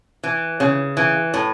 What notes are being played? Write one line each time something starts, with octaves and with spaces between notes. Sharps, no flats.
E3
C#3
E3
A2